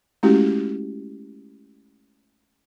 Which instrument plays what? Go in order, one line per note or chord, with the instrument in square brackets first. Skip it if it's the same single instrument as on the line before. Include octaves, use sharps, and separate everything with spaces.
[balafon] G#3 A3 C#4 E4 F#4 G4